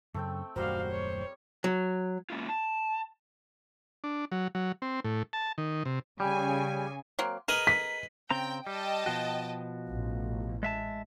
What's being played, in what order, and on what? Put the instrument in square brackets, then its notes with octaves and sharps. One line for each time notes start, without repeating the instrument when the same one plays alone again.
[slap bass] F#2 C#3 [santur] A3 C4 G5
[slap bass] D#1 F#2 A3 [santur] G3 A#4 [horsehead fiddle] F#4 F5 [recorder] C5
[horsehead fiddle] C#5
[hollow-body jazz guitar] F#3
[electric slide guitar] G#3 A#3 C#4 E4 F4
A5
[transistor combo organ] D4
F#3
F#3
C4
A2
A5
D#3
C3
[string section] C#3 G#5 [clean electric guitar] G3
[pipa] F#3 A#3 C4
[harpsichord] G#4 B4 D#5 [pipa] A#4
[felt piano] B6
[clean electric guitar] C#3 C4 A#5 [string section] G5
[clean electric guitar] G3 [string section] D#5 G5 A5
[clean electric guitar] B2 F3 F#4
[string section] A1
[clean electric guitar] G#3 E5 A5